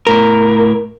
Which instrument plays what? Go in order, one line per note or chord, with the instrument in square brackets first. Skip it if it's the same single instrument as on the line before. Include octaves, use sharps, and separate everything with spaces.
[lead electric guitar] A2 A#4